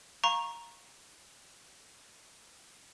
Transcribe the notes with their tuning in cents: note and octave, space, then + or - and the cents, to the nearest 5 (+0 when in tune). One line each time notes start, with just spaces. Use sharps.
F5 +0 A#5 +10 C#6 -15